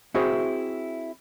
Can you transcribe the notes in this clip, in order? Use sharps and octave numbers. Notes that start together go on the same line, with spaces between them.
C4 E4 F#4 G#4 C5